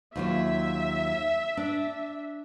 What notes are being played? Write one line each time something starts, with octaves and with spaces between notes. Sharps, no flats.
D#2 F#3 F4 E5
D4